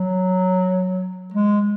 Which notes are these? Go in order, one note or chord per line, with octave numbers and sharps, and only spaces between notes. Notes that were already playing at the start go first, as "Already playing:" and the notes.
Already playing: F#3
G#3